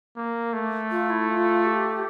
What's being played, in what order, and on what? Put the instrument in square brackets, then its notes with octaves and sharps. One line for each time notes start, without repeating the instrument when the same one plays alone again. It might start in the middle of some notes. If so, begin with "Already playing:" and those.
[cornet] A#3
A3
[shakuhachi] F4
E4
F4
G4